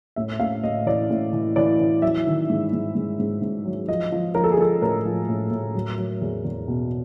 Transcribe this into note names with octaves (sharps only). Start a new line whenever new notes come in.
A2 E5
A2 F5
A2 D#5
E3 D5
A2
E3
E3 D5
E3
F#3 E5
D#3
G#2
G#2
G#2
G#2
G#2
F#3
F3 D#5
F3
F3 A#4
A4
G#4
F3 A4
A2 A#4
F3
A2
A2
F#3
F#3
E2
E2
B2